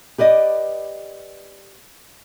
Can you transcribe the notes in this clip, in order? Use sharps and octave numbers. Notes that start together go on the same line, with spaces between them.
G4 B4 D5 D#5